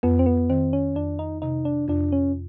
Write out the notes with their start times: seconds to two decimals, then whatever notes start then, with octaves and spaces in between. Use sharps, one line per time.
0.03 F2 B3
0.19 C4
0.26 B3
0.50 D#3 C4
0.73 C#4
0.96 F2 D4
1.19 D#4
1.42 C3 D#4
1.65 D4
1.88 F2 D4
2.12 C#4